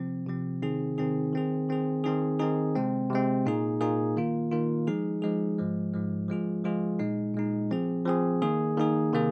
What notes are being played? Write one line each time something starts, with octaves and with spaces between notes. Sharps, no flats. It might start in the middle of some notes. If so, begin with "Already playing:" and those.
Already playing: C3 F3 C4
C3 F3 C4
C3 D#3 C4 D#4 G#4
C3 D#3 C4 D#4 G#4
D#3 C4 G#4
D#3 C4 G#4
D#3 C4 D#4 G#4
D#3 C4 D#4 G#4
C3 G#3 C4
C3 G#3 C4
A#2 A#3 D#4 G#4
A#2 A#3 D#4 G#4
D#3 A#3 F4
D#3 A#3 F4
F3 G#3 D#4 G#4
F3 G#3 D#4 G#4
G#2 F3 G#3
G#2 F3 G#3
F3 G#3 F4 G#4
F3 G#3 F4 G#4
A#2 G#3 D#4
A#2 G#3 D#4
F3 C4 G#4
F3 C4 G#4
D#3 A#3 D#4 G#4
D#3 A#3 D#4 G#4
C3 D#3 A#3 G#4